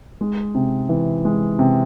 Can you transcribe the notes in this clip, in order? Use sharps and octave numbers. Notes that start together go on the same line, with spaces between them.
G#3
C3
E3
G#3
C3